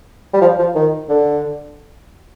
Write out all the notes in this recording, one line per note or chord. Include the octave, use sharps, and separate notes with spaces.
G3
F3
F3
D#3
D3